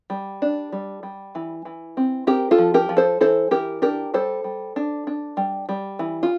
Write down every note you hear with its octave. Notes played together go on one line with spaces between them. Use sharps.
G3
D4
G3
G3
E3
E3
C4
C4 G4 A#4
F4 A4
F3
G4 A#4
F3
A4 C5
E3 A4 C5
E3 G4 A#4
D4 G4 A#4
G3 A4 C5
G3
D4
D4
G3
G3
E3
F4